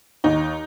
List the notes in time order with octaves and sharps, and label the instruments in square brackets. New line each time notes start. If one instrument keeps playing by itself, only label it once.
[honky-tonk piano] D#2 D#4